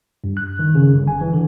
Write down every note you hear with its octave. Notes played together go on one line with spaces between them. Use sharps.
G2
F#6
D#3
C#3
G1
G#5
E3
D3